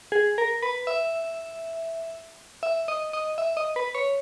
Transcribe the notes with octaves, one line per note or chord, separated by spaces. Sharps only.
G#4
A#4
B4
E5
E5
D#5
D#5
E5
D#5
B4
C#5